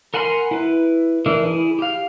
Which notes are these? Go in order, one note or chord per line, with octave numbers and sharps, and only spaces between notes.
A#4 F#5 G#5 B5 C6
E4 B4
E3 D4 E4 A#4
E4 G#4
G4 F5